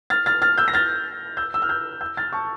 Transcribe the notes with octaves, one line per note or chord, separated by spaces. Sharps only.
F6 A6
F6 A6
F6 A6
E6 G6
A#6
F6 A6
E6 G6
E6
F6
E6 G6
E6 G6
F6 A6
A5 C#6